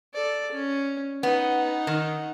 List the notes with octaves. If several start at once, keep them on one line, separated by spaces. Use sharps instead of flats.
A4 D5
C#4
B3 D#4 F#5
D#3